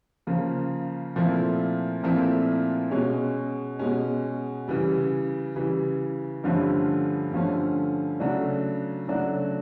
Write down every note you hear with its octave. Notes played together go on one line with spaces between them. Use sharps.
C#3 F3 A#3
A#2 F3 A3 C4 E4
A#2 F3 A3 C4 E4
B2 G#3 C#4
B2 G#3 C#4
C#3 E3 G3
C#3 E3 G3
G2 D3 F3 A3 C#4
G2 D3 F3 A3 C#4
C#3 F#3 A3 D4 F#4
C#3 F#3 A3 D4 F#4